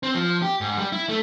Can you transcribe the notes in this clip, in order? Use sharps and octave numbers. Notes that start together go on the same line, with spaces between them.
C4
F3
G4
G#2
G3
E4
A3